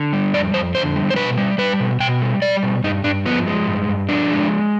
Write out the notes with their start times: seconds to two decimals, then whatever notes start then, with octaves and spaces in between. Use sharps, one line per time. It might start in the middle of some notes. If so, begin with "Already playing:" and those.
Already playing: D3
0.13 G3
0.34 F2 D5
0.54 F2 C5
0.75 D3 C5
0.96 G3
1.10 C5
1.16 B2 B4
1.38 G3
1.58 G3 B4
1.80 B2
2.00 B2 G5
2.22 G3
2.42 G3 D5
2.63 B2
2.84 G2 D#4
3.04 G2 D4
3.26 F3 B3
3.47 G#3
3.67 G2
3.89 G2
4.09 F3 D4
4.31 G#3